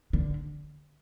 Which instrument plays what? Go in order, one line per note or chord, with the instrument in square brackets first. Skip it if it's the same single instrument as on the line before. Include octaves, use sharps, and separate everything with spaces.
[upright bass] D3